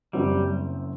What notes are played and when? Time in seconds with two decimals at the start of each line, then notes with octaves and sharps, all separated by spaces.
0.13 F#1 F#2 F#3 G3 C4 F#4